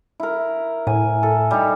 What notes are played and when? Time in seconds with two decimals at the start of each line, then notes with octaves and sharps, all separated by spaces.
0.20 E4 A#4
0.87 A2 G#5
1.23 A4
1.51 G3 D#4